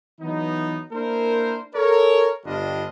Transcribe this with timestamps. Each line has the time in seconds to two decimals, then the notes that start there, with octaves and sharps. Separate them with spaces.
0.20 E3 F#3 B3 D#4
0.92 A#3 D4 E4 A#4 C5
1.75 A4 A#4 C#5
2.45 G1 G2 G3 D4 F4 D#5